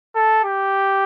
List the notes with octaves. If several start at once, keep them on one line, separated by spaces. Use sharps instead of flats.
A4
G4